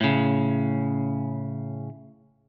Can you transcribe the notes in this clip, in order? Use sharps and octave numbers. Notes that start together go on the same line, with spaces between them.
A2 C#3